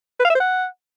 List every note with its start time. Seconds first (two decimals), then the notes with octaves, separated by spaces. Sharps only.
0.20 B4
0.25 F5
0.30 E5
0.35 C5
0.40 F#5